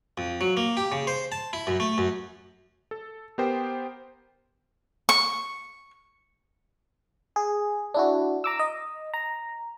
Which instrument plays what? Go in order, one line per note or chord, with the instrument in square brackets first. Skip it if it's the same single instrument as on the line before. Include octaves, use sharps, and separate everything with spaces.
[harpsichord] F2
F#3
A#3
G4
C#3
C5
A5
E4
F#2
A3
F#2
[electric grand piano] A4
B3 G4 A#4 C5 G5
[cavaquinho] C#6
[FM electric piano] G#4
D4 E4 F#4
A#5 D6 E6
D#5
A#5